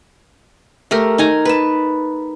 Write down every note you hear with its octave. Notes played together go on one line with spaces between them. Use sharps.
A3 G4 A#4
D#4 G#5 A#5
B4 A5